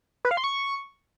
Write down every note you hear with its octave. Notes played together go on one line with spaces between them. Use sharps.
B4
F5
C6
C#6